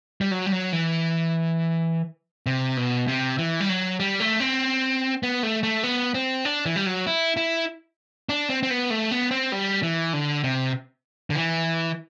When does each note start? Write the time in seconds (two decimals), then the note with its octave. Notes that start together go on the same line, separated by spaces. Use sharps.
0.21 G3
0.31 F#3
0.46 G3
0.52 F#3
0.73 E3
2.46 C3
2.77 B2
3.08 C3
3.38 E3
3.60 G3
3.69 F#3
4.00 G3
4.20 A3
4.40 C4
5.23 B3
5.43 A3
5.63 A3
5.84 B3
6.14 C4
6.45 D4
6.66 E3
6.76 G3
6.86 F#3
7.07 E4
7.37 E4
8.29 D4
8.49 C4
8.63 C4
8.71 B3
8.90 A3
9.11 B3
9.31 C4
9.52 G3
9.83 E3
10.13 D3
10.44 C3
11.30 D3
11.35 E3